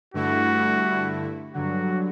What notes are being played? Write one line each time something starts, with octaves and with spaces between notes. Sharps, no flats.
G2 D3 A3 E4 F#4
G2 D3 F#3 F#4